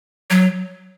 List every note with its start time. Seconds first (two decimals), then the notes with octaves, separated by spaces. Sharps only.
0.31 F#3